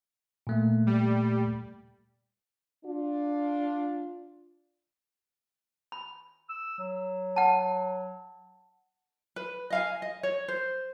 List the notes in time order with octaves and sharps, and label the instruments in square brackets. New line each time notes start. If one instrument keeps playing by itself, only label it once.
[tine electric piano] A#2 A3 A#3
[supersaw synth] G3
[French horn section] D4 F4
[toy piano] B5
[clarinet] E6
F#3
[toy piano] F#5 A5
[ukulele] B4
D#5 F5 G#5
D#5
C#5
C5